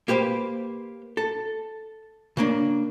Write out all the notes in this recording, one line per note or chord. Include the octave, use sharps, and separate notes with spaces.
A#3 G4 B4 C5
A4
C#3 A#3 D4